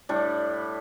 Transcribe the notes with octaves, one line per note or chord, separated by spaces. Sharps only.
A2 G3 D4